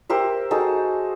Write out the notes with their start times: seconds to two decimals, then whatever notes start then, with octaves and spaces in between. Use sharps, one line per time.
0.09 G4 A#4 C5 E5
0.51 D#4 F#4 G#4 A4